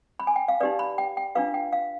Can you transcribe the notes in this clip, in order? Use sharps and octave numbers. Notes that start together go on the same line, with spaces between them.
B5
G#5
G5
F5
D#4 G4 B4 D5
B5
G5
G5
D4 F4 B4 F5
G5
F5